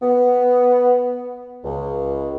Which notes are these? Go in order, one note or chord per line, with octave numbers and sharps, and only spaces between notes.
B3
C#2